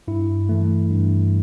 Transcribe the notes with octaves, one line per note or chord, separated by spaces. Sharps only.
G2 E4
E3 A3
G2